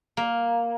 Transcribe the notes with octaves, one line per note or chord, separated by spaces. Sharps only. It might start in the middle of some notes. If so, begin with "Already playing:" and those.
A#3